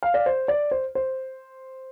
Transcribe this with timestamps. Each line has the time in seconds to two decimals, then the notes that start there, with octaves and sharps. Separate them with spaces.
0.03 F5
0.14 D5
0.26 C5
0.48 D5
0.71 C5
0.95 C5